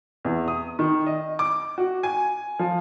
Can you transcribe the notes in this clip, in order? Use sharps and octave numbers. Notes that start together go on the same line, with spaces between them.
E2
D#6
D#3
D#5
D6
F#4
G#5
F3